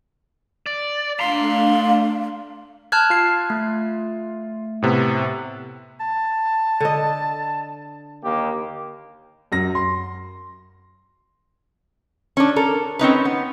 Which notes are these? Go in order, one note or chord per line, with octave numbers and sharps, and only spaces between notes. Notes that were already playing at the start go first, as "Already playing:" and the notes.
D5
A3 D4 F5 A#5 C6
A5 F6 F#6 G#6
F4 C7
A3
A2 C3 B3
A5
D3 D#5
D#2 A#3 G4
F#2 A#6
C6
C#4 D4
A4 A#4
C4 C#4 D#4 B4
B3